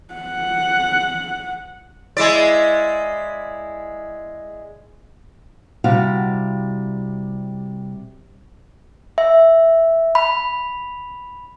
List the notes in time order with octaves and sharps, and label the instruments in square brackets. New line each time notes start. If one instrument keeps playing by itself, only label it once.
[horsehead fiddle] F#5
[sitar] G#3 E4 D5
[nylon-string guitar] C3 G3 E4 F#4 F5
[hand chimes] E5
B5